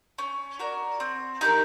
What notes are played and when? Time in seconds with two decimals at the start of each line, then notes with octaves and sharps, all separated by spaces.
0.18 C#4
0.59 F#4 A#4 D5
1.00 C4
1.41 D#4 G4 A#4